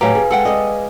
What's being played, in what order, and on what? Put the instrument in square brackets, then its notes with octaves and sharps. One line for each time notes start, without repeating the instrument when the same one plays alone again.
[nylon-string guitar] A2 F#3 [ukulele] G4 A#5 [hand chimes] B4 F5 G#5
[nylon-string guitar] G#4
[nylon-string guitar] G#3 [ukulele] A4 F#5 G5
[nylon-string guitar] G#3 D5 D#5